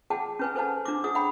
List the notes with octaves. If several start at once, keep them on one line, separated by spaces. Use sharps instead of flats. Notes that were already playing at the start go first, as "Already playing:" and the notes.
G#4 F#5 G5 A5
C#4 B4 G#5
A4 B4 C5 F#5 A5
D4 D6
G#4 F#5 D#6
F#5 G5 B5